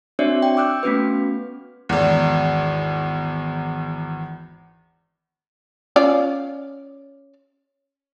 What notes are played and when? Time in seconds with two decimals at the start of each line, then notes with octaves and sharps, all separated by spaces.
0.19 C4 D4 F#4 C#5 D5 E5
0.43 G5
0.57 D6 E6 F#6 G6
0.83 A3 B3 C#4 F#4 B4
1.89 G#1 E2
5.96 C#4 F4 D5